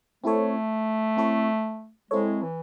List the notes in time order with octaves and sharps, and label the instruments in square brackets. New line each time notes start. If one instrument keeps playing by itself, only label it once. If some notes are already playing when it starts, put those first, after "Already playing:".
[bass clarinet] A3 [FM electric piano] C4 E4 A4 C#5
[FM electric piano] C4 E4 A4 C#5
[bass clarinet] G#3 [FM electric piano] C4 E4 A4 C#5
[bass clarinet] E3